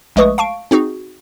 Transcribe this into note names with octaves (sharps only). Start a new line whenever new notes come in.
A#1 G#3 A3 B4 C#6 D#6
F5 A5 C#6 D7
C4 D#4 F#4 G#4